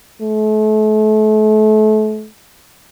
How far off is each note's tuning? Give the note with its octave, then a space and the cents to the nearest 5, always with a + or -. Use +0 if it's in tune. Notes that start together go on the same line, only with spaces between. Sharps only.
A3 -35